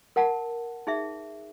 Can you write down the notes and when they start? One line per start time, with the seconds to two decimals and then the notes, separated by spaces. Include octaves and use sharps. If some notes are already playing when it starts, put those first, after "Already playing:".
0.16 A#4 F#5 A5
0.87 D#4 G#4 E5